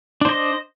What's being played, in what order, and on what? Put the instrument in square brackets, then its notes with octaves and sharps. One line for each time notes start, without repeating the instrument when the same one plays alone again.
[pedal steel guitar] D4
C5
D#5